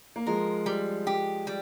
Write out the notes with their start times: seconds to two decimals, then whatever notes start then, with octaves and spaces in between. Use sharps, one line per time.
0.16 A#3
0.26 F3 G#3 A#4
0.66 G3
1.07 G4
1.47 G3